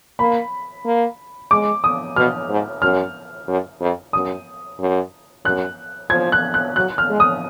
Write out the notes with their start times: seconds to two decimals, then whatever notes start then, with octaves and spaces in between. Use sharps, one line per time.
0.19 A#3 B5
0.85 A#3
1.51 G#3 D6
1.84 D#6
2.16 B2 F6
2.50 G#2
2.82 F#2 F6
3.48 F#2
3.81 F2
4.13 F#2 D#6
4.79 F#2
5.45 F#2 F#6
6.10 F3 G#6
6.32 F#6
6.54 F#6
6.76 F#3 F#6
6.98 F6
7.09 G#3
7.20 D#6